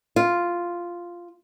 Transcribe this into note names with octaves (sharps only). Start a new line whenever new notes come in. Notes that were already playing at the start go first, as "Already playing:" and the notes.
F4